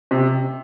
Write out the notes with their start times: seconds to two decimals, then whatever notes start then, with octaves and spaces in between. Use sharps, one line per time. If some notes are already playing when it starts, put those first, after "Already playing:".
0.11 C3